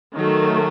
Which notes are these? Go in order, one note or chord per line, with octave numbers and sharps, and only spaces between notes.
D#3 F#3 A3